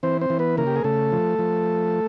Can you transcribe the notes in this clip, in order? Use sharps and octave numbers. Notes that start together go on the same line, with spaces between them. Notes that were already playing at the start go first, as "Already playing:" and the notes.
E3 C4 C5
C4 C5
E3
B3 B4
C#3 A#3 A#4
G4
G#4
C#3 A3 A4
F3
F3